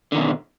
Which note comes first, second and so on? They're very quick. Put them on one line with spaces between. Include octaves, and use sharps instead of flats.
D3 D#3 B2